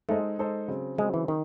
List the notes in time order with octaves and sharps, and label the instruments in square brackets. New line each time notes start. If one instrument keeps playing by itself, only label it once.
[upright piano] G#3 D#4 A4 C5 D#5 [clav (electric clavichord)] A3
[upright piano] G#3 D#4 A4 C5 D#5
C#3 F#3 C4
[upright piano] C#3 F#3 C4 [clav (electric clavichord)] G#3
[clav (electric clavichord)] E3
D#3